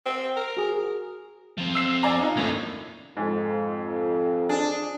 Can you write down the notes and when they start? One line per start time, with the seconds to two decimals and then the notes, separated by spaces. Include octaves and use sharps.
0.06 C4
0.36 A#4
0.57 F#4 G#4
1.58 F3 C4
1.75 E6 C7 E7
2.03 D5 G#5 A#5
2.19 D4 D#4 F4
2.37 F#2 A2 A#3 D#4
3.17 F2 G#2
4.49 D4 G#4